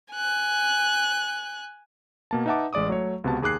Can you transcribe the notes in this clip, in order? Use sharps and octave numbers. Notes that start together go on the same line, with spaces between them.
G#5 F#6
B2 A#3 A5
D#4 B4 E5 F#5 A5 D6
A1 G#3 D5 D6 D#6
F#3 A3 C#5
C#2 C3 B3 F#4 A5
D#2 G#4 D6 F#6 C7